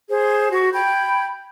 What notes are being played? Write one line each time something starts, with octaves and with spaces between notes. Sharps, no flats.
G#4 C5
F#4 C#6
G5 B5 G6 G#6